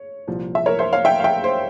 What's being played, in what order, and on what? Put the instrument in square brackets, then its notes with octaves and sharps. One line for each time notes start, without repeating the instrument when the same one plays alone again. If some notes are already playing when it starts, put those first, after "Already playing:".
Already playing: [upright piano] C#5
C2 A#2 F3
E5
A#4 C#5
C5 E5
C#5 F5
E5 G5
F5
E5 G5
C5